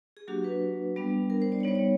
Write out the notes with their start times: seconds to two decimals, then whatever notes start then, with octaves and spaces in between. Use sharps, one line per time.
0.17 G#4
0.28 F#3 A#3 D4 F#4 G4
0.44 B4
0.96 G3 B3 D4
1.30 A#4
1.42 C5
1.52 D5
1.60 C#5
1.63 G3 B3 D#4 C5
1.75 C#5